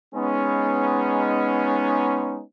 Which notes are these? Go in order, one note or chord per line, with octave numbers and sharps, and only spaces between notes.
G#3 B3 C#4 D#4